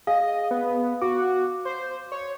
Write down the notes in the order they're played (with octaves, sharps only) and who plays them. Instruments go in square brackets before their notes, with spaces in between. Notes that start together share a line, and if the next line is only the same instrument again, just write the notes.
[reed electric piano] G#4 [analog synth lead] D#5 [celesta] F5
[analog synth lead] B3
[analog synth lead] F#4 [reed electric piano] D6
[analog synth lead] C5
C#5